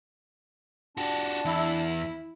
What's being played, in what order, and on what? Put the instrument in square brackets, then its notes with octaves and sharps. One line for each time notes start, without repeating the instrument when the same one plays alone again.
[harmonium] D4 A5 [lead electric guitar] F#4 G4
[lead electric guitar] E2 [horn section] E4